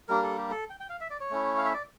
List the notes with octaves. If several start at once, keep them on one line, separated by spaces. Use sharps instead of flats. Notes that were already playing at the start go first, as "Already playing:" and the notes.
G3 A#3 D4 A#4
A4
G4
A4
G5
G5
F5
E5
D5
C#5
A3 C#4 E4
F5
E5
D5